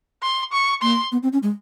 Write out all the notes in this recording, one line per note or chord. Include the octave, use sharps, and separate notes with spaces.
C6
C#6
A#3 C6
B3
C4
C#4
G#3